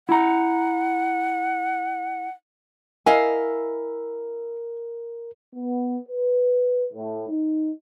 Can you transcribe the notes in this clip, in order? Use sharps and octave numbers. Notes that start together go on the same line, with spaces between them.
E4 F#5 A#5
E4 A#4 D#5 F5 G#5
B3
B4
A2
D#4